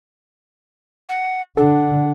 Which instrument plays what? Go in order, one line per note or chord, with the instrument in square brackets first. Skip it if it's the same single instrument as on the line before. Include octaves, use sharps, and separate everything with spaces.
[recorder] F#5
[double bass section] D3 [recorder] D4 [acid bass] A4 [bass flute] F#5